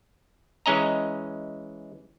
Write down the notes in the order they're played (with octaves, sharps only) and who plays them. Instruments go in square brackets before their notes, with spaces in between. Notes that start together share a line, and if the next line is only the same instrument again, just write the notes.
[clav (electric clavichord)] E3 G#3 C#4 D#5 A#5